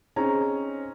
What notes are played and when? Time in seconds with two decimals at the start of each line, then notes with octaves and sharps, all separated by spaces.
0.16 C4 C#4 D#4 G#4 A#5